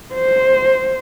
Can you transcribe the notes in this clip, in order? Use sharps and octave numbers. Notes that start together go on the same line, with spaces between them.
C5